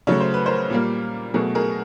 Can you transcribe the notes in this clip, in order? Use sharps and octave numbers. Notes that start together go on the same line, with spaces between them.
C#3 F#3 A3 C#5
C5
B4
A#4 C5
A#2 G3 A#3
B2 F#3 A3 G#4 A#4
G#4 A#4